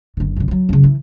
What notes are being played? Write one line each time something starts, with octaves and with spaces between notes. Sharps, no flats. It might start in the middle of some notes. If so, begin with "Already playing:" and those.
F#1 D3
F#2 C#3
F3 F#3
F#2 C#3
E3